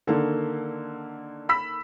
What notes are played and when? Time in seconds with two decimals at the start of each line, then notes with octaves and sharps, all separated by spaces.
0.07 D3 D#3 A#3 A4
1.49 B5 E6 B6